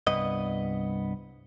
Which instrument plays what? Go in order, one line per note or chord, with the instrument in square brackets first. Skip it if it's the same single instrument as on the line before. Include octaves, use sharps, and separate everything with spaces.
[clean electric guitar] C2 G2 B3 D#5